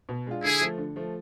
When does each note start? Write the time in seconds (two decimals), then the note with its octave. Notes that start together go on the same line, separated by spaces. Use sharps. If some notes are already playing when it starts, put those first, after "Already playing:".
0.09 B2
0.27 G#3 D4 F4
0.44 D3 E4 G#4
0.61 F3 A3
0.78 D3
0.96 F3 A3